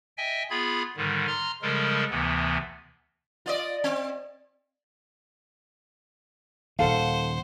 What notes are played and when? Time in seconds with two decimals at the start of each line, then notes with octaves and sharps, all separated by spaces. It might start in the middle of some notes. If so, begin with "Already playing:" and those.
0.17 D#5 E5 G5 G#5
0.50 B3 F4 G#4 B5 G#6
0.97 G#2 D3 D#3 G3
1.27 A#5 C6 F6
1.62 C#3 F3 G3 G#3 A4 A#4
2.10 D2 C3 E3 B3
3.46 F4 D5 D#5
3.84 C4
6.79 D#1 D#3 A4 C5 F5 F#5